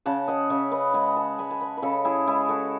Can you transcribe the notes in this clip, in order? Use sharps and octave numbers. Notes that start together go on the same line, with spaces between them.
C#3 F#5 A5
D#5 F#5
C#3 C#5 E5
B4 D#5
G#3 D#5 F#5
F#5 A5
G#3 G#5 B5
A5
G#5 B5
B4
C#3 A4 C#5
E4 G#4
G#3 E4 G#4
F#4 A4